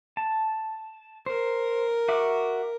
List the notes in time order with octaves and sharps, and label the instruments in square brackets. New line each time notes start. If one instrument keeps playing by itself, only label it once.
[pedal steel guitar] A5
[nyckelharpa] A#4 [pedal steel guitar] C5
[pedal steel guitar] F#4 E5 D6